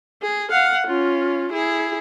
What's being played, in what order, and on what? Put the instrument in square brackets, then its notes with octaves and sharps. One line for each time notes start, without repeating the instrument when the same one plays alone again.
[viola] G#4
F5 F#5
C#4 F4
E4 G#4